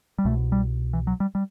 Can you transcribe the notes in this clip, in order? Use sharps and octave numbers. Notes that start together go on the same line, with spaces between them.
G3
C2 B2 A3
G3
E3
F#3
G3
G3